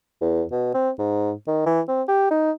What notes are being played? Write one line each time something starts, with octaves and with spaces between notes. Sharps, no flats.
E2
B2
C4
G#2
D#3
E3
C4
G4
D#4